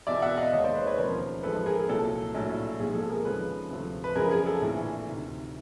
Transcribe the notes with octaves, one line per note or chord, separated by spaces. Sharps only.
E1 E2 B2 D5 E5
E5 F#5
D#5 F5
D#2 D#3 G#3 C#5 D#5
C5 D5
B4 C#5
B4 C#5
E1 D#2 C#3 F3 A#4 C5
A1 G#2 F3 G#3 A4 B4
G#4 A#4
C2 A#2 F#3 A4
A#1 A2 F#3 A3
B1 A#2 F3 G#3 G#4
G#4
A4
G#4 A#4
D#2 C#3 F3 G#3 A4 B4
D2 C3 F3 A3
B4
F#2 C#3 F3 G#4 A#4
G#4
A4
A#1 A2 E3
D2 C3 D#3